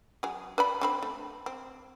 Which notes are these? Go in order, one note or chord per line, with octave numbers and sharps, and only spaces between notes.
F#3 G#4
B4 D5 B5
D3 C4 B5
A3
C4